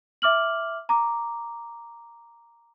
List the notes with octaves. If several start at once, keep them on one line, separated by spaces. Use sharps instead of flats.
E5 D6 F6 F#7
A#5 D6